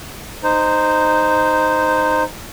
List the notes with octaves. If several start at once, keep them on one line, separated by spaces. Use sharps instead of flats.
D#4 C5